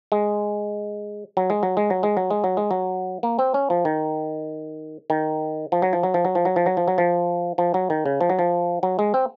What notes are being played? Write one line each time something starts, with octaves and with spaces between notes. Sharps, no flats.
G#3
F#3
G#3
F#3
G#3
F#3
G#3
F#3
G#3
F#3
G#3
F#3
A#3
C4
C#4
F3
D#3
D#3
F3
F#3
F3
F#3
F3
F#3
F3
F#3
F3
F#3
F3
F#3
F3
F3
F#3
D#3
C#3
F3
F#3
F3
F#3
G#3
C4